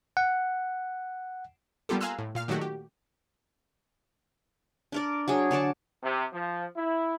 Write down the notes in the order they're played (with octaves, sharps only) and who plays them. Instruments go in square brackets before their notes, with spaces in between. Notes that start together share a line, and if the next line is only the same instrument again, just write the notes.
[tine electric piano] F#5
[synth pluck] G3 A#3 B3 F4 G4 A4
F5 G#5 A#5 C6 E6 F#6
A2
A#2 F5 F6
A#2 D#3 F#3 A3 F#4 G4
G4
[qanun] D4 A#4 D5
F#3 D4 G#4
D3 C#5 D5 A5
[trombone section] C3
F3
E4